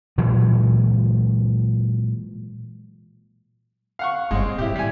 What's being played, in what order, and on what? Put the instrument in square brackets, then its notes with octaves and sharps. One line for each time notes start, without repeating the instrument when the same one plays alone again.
[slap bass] A#2 E3 F#3 G#3
[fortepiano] F5 F#5 C#6
[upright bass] G1 [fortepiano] G#3 C4
[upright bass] A#3
[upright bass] A2 [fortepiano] E4 G4
[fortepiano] G3 G#5